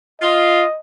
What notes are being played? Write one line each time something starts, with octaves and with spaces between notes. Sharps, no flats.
F4 D#5